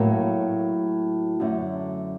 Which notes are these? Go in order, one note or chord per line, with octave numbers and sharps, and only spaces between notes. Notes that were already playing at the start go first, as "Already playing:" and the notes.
Already playing: A2 F#3 A#3
F#2 D3 A3